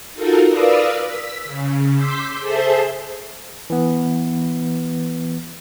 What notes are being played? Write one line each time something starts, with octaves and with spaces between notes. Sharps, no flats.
D#4 F4 F#4 A4 A#4
A#4 B4 D5 F5 D#6 E6
E6 B6
C#3
C6 D6 E6 G6 B6
G#4 A4 C5 E5 A5 C6
E3 B3